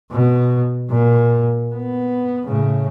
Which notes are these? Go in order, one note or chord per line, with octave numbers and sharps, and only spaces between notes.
B2
A#2
B3
A2 C#3